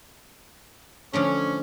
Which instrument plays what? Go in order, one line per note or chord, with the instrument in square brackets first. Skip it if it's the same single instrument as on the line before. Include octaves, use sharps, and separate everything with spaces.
[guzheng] D3 F3 A3 [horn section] C#4